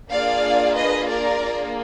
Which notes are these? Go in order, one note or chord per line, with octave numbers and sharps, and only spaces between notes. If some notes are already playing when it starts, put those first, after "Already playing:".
A#3 D4 F4 G#4 D5 F5
B4 D#5
A#4 D5
A#3 D4 F4 G#4